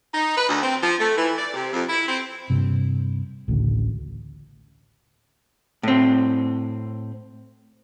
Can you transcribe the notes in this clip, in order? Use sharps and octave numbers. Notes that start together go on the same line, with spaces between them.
D#4
B4
D2
C4
F3
A3
E3
D5
C3
F2
E4
C4
G2 C3
A1 D2 C#3
A2 C4